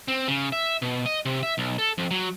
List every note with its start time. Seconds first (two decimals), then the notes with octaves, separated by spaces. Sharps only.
0.08 C4
0.28 C#3
0.52 E5
0.82 B2
1.06 D#5
1.26 C3
1.43 E5
1.58 B1
1.78 A4
1.98 F2
2.11 F#3